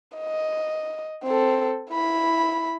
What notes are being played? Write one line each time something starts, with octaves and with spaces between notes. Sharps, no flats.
D#5
C4 A4
E4 B5